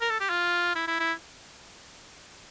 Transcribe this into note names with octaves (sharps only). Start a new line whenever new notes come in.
A#4
A4
G4
F4
E4
E4
E4